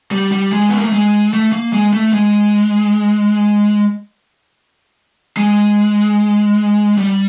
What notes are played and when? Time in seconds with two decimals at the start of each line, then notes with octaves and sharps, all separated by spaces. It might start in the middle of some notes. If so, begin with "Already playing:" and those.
0.11 G3
0.32 G3
0.52 G#3
0.69 B3
0.76 A#3
0.85 A3
0.93 G#3
1.33 A3
1.52 A#3
1.73 G#3
1.93 A3
2.13 G#3
5.37 G#3
6.97 G3